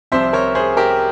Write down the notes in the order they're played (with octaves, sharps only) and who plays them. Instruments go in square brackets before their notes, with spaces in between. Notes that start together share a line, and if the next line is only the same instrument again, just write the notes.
[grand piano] C2 C3 F3 C4 C5 E5
A#4 C#5
G#4 C5
G4 A#4